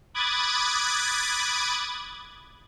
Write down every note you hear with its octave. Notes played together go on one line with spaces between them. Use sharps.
B5 D6 D#6 F#6 G#6 A6